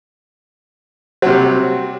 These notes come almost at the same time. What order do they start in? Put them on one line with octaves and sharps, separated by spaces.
F#3 C3 G3